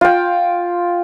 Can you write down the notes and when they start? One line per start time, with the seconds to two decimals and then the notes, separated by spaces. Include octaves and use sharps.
0.01 F4 G5